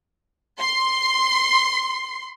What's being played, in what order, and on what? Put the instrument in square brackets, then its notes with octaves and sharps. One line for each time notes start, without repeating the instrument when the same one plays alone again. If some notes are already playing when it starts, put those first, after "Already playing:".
[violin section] C6 C7